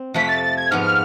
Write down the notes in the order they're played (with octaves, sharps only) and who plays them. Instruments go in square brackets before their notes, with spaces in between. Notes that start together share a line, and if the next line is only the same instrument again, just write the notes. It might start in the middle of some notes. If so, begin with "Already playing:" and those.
Already playing: [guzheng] C4
[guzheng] F2 C3 F3 A3 [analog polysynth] B6
[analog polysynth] A6
A6
G#6
[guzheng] G#2 F3 B3 [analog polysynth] F6